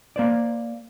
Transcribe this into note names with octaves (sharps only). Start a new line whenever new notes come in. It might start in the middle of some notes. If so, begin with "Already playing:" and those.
A#3 C5 D5